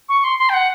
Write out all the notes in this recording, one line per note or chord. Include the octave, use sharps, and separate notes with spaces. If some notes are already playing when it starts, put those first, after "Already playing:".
C#6
C6
C6
G5
F#5